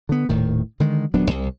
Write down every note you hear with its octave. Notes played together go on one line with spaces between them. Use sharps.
D3 B3
D#1 A2 D#3
D3 D#3 G#3
D#1 F#3 B3 D4
C2